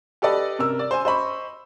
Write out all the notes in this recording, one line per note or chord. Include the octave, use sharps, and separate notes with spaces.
G4 A4 B4 D5 D#5
C3 A#4 E6
D5
C5 G#5
C5 D#5 B5 C#6